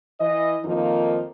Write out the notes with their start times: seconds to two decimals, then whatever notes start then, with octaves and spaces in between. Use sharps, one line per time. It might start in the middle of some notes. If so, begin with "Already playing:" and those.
0.19 E3 D#5
0.64 F2 D#3 F3 A#3 D#4 F4